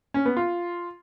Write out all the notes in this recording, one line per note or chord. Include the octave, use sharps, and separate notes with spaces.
C#4
B3
F4